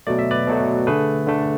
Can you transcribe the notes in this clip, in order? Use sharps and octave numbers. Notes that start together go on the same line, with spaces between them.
B2 F#3 A3 D5
E5
B4 D5
B2 F#3 A3
D3 A3 G#4 B4
D3 A3